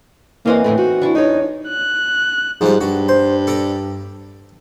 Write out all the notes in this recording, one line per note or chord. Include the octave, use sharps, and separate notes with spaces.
F#2 E3 A#3 C4 D#5 F5 F#5
F2 A2 D3 A3
D#4 F#4
E3 D4 E4 C#6
E2 D#4 C#5
F#6
G#2 F3 G3
G2 F#4
C5
A4 D5 A#5